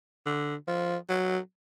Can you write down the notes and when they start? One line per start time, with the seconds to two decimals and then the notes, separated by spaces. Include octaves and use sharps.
0.26 D3
0.68 F3
1.09 F#3